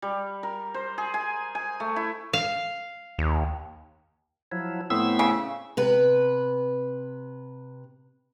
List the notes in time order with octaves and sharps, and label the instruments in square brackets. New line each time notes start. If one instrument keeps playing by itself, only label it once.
[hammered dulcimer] G3
A#4
C5
G#4
G#5
G#5
A3
E4
[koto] F5
[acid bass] D#2
[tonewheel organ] F3 F#3 E4
[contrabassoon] A2 [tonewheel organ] B3 C4 E6
[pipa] C#3
[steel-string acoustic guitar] C3 B4